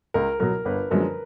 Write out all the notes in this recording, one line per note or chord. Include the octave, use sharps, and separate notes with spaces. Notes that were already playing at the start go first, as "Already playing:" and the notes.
C#2 A#4
B2 F#3 A#4
G1 B4
F#2 D3 F3 G#3 A#4